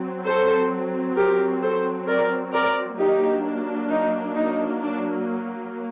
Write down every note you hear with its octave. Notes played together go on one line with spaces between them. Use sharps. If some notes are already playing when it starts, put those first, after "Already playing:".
Already playing: F#3 C4
A4 C5
G4 A#4
A4 C5
A#4 D5
A#4 D5
F#3 A#3 D4 D#4 G4
D#4
D#4
D4